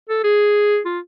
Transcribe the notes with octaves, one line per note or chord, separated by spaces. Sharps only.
A4
G#4
F4